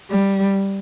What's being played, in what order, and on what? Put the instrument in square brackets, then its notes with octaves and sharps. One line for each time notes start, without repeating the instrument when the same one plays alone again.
[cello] G3